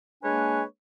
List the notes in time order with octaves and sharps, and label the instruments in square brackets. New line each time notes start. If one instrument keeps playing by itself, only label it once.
[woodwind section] G#3 A#3 D4 B4 C#5 G#5